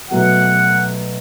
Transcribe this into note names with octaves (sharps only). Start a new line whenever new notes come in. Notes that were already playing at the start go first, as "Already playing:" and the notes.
B2 F#3 A3 F#5